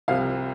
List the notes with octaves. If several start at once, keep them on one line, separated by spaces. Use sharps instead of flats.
C2 C3 F3 F5